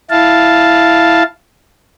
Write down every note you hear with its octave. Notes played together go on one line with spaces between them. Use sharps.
E4 F5 A5